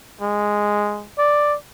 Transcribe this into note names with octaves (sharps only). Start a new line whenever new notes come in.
G#3
D5